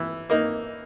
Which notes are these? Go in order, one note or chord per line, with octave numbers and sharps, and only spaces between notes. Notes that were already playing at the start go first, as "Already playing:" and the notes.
Already playing: E3
A#3 D#4